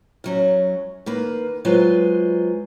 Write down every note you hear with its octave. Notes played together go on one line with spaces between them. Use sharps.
F#2 F#3 C#4
D#3 A#3 B4
F#3 G#3 F4 B4 C5 D#5